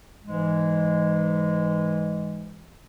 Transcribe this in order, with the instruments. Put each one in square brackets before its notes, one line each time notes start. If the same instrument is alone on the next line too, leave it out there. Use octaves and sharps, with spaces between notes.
[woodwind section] G#2 E3 G#3